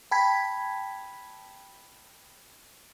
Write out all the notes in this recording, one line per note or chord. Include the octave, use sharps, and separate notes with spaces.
G5 A5 B5 G#6 B6